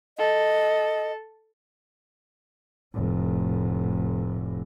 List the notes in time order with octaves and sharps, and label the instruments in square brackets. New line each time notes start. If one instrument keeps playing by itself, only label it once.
[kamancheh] A4 [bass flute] D#5
[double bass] F1 A2